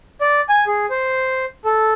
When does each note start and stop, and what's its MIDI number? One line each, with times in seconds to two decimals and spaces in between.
0.21 0.41 74
0.49 0.64 80
0.67 0.86 68
0.90 1.45 72
1.65 1.94 69